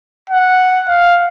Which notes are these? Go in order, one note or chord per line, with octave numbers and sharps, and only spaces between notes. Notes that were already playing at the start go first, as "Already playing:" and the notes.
F#5
F5